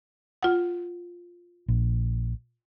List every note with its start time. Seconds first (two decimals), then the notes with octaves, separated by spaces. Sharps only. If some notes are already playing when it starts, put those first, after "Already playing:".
0.43 F4 F#5
1.68 A#1